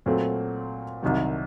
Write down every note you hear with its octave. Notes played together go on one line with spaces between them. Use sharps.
A#2 F#3 A3 C4
C2 C3 D#3 F#3